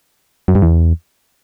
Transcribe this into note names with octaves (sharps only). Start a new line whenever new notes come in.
F#2
G2
E2